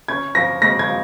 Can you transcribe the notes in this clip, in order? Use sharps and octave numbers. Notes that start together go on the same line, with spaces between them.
C#4 G#6
F3 A#6
G#3 A#6
G#6
F3